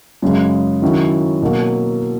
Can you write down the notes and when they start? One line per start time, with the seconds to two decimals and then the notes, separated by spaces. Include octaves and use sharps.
0.22 F#2 C#3 G#3
0.82 D#3 F#3 C#4 E4
1.42 B2 F#3 A#3